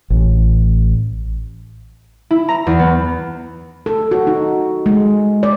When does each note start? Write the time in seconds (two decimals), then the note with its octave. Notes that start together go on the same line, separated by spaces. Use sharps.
0.10 A1
2.31 E4
2.49 A#5
2.67 E2
2.79 B3
3.86 A4
4.11 F#4
4.27 D#4
4.86 G#3
5.43 D5